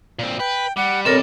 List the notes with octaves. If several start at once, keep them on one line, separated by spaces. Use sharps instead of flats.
A#2 C4
B4 G5
G3 F#5
B2 G3 C4 A4 A#4 C#5